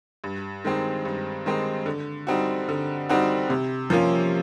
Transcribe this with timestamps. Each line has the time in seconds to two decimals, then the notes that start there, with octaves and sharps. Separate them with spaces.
0.24 G2
0.64 D#3 G#3 C4 D#4
1.05 G2
1.46 D#3 G#3 C4 D#4
1.86 D3
2.27 G3 C4 D#4 F#4
2.69 D3
3.09 G3 C4 D#4 F#4
3.50 C3
3.90 F3 A#3 C#4 F4